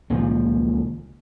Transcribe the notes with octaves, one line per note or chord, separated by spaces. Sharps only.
C#2 A#2 D#3 F3